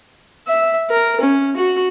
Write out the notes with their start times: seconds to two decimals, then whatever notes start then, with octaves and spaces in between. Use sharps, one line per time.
0.47 E5
0.90 A#4
1.21 C#4
1.57 F#4